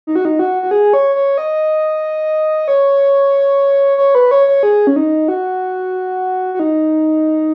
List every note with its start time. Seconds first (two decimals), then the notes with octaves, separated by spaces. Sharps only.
0.07 D#4
0.16 F#4
0.25 D#4
0.39 F#4
0.63 F#4
0.71 G#4
0.93 C#5
1.15 C#5
1.38 D#5
2.68 C#5
3.97 C#5
4.15 B4
4.31 C#5
4.47 C#5
4.63 G#4
4.87 C#4
4.96 D#4
5.28 F#4
6.54 F#4
6.59 D#4